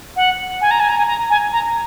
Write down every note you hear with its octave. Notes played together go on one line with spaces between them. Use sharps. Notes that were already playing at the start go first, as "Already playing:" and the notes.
F#5
G#5
A#5
G#5
A#5
G#5
A#5
G#5
A#5